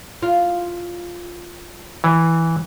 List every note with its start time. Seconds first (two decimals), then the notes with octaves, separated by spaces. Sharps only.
0.22 F4
2.04 E3